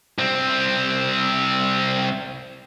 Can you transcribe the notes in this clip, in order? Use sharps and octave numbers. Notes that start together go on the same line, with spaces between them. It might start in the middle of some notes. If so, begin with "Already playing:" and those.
C2 C4